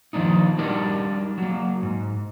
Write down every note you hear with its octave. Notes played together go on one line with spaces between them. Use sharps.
D#3 F3 A#3 D4 D#4
G3 D4 D#4 G4 A#4 D5
F#3 A#3
G#2